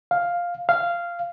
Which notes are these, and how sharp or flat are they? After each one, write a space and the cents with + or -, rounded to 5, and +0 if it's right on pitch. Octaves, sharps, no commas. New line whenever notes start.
F5 +5
F5 -10